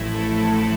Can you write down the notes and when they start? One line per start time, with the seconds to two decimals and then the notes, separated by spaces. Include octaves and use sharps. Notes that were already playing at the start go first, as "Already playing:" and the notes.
Already playing: A1 A2 F3 A3 E4
0.11 A4